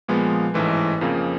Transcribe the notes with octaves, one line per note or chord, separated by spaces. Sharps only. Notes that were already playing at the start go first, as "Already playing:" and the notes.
A#2 F3 G#3 B3
A1 G#2 E3 A3
F2 C#3 F3 A#3